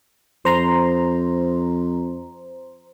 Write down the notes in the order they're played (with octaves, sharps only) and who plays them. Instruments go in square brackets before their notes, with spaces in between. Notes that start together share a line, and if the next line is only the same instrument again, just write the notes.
[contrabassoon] F2 [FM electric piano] C5 A#5 C6